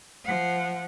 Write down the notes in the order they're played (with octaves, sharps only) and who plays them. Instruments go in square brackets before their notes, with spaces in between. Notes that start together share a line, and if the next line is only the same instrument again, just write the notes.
[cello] F3 F#5